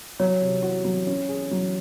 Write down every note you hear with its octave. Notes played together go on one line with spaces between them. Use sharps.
F#3 C#5
C3
F#4
F#3
C#4
G#4
F#3